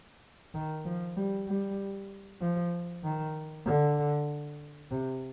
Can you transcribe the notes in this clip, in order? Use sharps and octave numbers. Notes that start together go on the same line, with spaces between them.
D#3
F3
G3
G3
F3
D#3
D3
C3